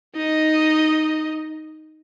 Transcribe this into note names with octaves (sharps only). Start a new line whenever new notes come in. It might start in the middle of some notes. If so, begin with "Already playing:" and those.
D#4 D#5